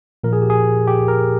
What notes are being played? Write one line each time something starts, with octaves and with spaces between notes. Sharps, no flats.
A#2 F3 A#4
G#4
G4
G#4
G4
A#4